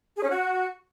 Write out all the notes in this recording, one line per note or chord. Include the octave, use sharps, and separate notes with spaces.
G#4
C#4
F#4